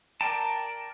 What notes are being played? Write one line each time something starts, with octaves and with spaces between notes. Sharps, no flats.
A#4 D5 G5 A5